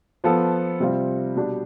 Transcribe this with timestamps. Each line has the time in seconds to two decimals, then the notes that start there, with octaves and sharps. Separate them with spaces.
0.24 F3 B3 F4 A4
0.80 C3 G3 C4 F4
1.36 B2 G3 D4 G4